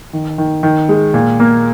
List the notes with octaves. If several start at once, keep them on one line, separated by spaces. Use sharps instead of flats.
D#3
D#3
D#3
G#3
A#2
A#3